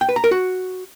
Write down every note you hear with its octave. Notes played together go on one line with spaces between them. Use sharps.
G5
B4
A#5
A#4
F#4